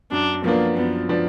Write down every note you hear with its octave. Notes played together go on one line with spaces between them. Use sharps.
F#2 D4
F3 A#3 B3 D4
F#2 B3
F3 B3 D4